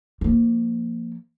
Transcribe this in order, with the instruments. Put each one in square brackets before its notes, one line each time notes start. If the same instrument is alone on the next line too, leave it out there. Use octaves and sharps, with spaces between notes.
[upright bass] F3 A#3